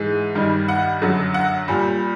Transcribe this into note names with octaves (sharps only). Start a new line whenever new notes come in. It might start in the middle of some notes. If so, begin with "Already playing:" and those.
Already playing: G#2 E3 G#3
G2 D#3 G3
F#5
F#2 D3 F#3
F#5
A#2 G3